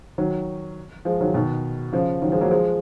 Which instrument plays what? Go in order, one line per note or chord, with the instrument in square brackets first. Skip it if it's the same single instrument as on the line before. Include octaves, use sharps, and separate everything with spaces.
[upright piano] D#3 F#3
F3 G#3
D#3 F#3
B2 D#3
C#3 F3
D#3 F#3
F3 G#3
F#3 A#3
F3 G#3